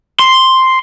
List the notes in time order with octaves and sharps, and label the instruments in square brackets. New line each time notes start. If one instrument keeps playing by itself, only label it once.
[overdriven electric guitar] C6